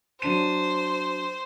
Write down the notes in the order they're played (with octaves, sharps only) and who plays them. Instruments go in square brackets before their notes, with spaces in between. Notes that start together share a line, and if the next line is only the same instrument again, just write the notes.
[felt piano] F#3 D4 D#7 [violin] C5